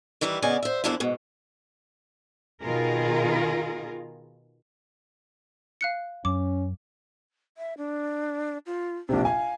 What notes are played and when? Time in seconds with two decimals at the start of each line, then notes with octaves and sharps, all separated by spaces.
0.21 D#3 E3 G3 E4 B4
0.42 C#3 B3 D5 D#5 G#5
0.62 C5 E5
0.84 E2 A#2 F3 A#3 D4 E4
1.00 G#2 B2
2.62 B2 D#3 F4 G#4 A#4
5.81 F5 F#6 C#7
6.25 F#2 C#4 D6
7.58 E5
7.78 D4
8.66 F4
9.09 A#1 C3 D4
9.25 F5 G#5